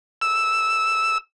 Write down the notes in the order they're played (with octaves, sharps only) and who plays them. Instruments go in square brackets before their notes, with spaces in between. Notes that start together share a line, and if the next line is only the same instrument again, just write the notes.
[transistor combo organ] E6